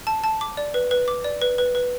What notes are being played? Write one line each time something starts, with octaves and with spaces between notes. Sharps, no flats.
A5
A5
D6
D5
B4
B4
D6
D5
B4
B4
B4